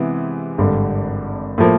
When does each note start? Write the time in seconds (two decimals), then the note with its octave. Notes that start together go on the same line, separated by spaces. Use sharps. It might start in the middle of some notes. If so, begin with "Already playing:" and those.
Already playing: C3 E3 G#3 B3
0.58 G#1 G2 D3
1.58 A2 F3 A#3